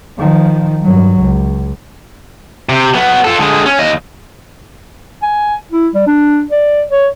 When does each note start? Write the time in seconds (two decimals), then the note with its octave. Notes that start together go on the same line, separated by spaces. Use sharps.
0.19 D#3 F3
0.82 G2 F#3
1.20 C#2
2.69 C3
2.94 F#3 B3
3.25 F4 A4
3.39 D3 G#3
3.66 C#4
3.79 D#2 D#5
5.23 G#5
5.72 E4
5.94 G3
6.07 D4
6.51 D5
6.91 C#5